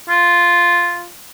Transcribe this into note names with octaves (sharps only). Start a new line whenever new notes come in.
F4